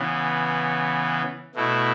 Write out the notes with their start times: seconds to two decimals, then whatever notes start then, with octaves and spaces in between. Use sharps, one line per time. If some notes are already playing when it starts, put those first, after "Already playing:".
Already playing: C#3 E3 B3
1.55 B2 A3 E4